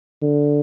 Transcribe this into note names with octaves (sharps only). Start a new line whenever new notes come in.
D3